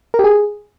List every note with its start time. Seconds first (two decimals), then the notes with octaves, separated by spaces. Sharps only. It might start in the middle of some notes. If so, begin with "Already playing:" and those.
0.14 A#4
0.19 G4
0.24 G#4